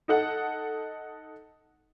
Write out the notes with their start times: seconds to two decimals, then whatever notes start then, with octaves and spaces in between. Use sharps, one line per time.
0.08 D#4 A4 F#5